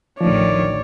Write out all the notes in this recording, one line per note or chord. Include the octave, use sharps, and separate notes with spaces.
A1 D2 D#3 F3 C#5 D5